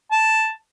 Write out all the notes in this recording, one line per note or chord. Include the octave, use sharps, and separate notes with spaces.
A5